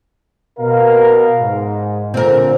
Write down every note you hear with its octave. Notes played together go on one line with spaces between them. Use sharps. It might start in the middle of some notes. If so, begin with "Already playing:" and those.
B2 A#4 F5
G#2
A#2 D3 C4 A#4